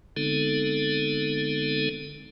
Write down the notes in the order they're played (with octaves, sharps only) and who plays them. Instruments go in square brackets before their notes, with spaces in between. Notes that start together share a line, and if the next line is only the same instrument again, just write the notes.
[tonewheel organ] D3 G#3 B3 C4 D#4 A4